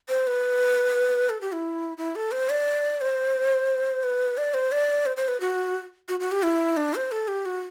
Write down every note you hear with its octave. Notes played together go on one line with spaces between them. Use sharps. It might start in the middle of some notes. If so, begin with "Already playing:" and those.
C5
B4
A4
G4
E4
E4
A4
C5
D5
C5
B4
D5
C5
D5
C5
C5
B4
F#4
F#4
F#4
G4
E4
D4
C5
A4
G4
F#4